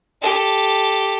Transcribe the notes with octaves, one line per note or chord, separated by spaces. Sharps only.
G4 A4